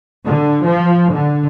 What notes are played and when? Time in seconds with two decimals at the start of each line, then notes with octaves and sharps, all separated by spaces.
0.24 D3
0.66 F3
1.12 D3